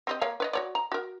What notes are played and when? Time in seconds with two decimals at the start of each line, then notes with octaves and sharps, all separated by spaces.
0.07 C4 G4 D#5
0.21 A#3 C#5 F5
0.40 B4 C#5 D#5
0.53 F#4 C#5 D5
0.75 A#5
0.92 F#4 A#4